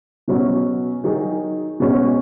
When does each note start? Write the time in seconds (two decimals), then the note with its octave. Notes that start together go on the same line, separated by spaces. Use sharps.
0.28 B2 F#3 C#4 F#4
1.04 D#3 F#3 D#4 G#4
1.80 B2 G#3 C#4 F#4